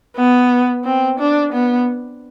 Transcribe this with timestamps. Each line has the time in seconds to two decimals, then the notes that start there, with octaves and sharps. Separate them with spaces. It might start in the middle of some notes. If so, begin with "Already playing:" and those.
0.17 B3
0.85 C4
1.19 D4
1.53 B3